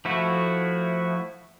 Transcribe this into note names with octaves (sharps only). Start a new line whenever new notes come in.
F3 A3 E4 F#4